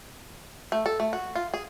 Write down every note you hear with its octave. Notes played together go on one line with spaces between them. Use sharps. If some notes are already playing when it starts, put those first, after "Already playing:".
A3
A4
A3
F#4
F4
G#4